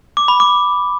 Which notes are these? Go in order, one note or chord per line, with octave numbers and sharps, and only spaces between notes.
D6
B5
D6